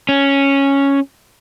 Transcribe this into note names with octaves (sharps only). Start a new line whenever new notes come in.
C#4